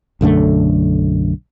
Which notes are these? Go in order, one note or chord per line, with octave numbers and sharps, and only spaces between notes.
B1 F#2 D3 A3